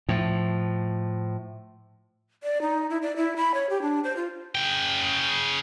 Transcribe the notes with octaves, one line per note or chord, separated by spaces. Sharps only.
A2 F3
D5
D#4
E4
D5
E4
B5
C#5
G4
D4
C5
F4
C#3 G5